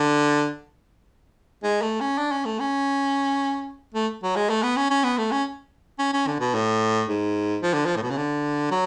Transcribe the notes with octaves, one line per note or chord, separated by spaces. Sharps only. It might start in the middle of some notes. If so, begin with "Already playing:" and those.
Already playing: D3
G#3
A3
C#4
D4
C#4
A3
C#4
A3
F#3
G#3
A3
B3
C#4
C#4
B3
A3
C#4
C#4
C#4
D3
B2
A2
G#2
F3
D3
F3
A2
B2
C#3
D3
F#3